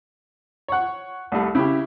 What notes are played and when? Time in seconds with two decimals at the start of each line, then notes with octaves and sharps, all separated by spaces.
0.68 C#5 F#5
1.32 C2 G3 A3
1.55 C#3 E4 G4